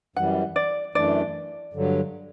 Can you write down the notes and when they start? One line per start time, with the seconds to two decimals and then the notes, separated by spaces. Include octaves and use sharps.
0.16 F#2 E3 G3 F#5
0.56 D5
0.95 F#2 E3 A3 D4 D5
1.73 G2 D3 F#3